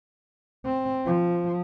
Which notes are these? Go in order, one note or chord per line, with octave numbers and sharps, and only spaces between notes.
C4
F3